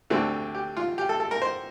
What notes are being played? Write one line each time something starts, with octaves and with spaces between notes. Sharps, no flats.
D2 D3 A3 C4 G4
G4
F4
G4
A4
A4
A#4
C5